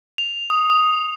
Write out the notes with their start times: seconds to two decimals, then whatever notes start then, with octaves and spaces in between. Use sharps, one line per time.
0.18 F7
0.50 D#6
0.70 D#6